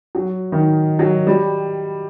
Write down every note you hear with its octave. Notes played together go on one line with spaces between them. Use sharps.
F#3
D#3
F#3
G3